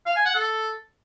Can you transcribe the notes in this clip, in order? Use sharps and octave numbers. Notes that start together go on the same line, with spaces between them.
F5
G#5
F#5
A4